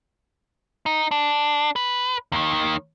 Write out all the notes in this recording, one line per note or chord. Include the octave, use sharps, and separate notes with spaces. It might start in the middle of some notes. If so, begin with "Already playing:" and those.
D#4
D4
B4
D#2 D#3